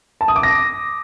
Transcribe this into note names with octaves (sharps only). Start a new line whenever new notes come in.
A5
D#6
D6
A#6